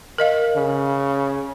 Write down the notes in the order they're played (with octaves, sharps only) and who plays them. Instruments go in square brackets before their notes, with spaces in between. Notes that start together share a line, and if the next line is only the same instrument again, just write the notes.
[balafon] A#4 D#5 F5
[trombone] C#3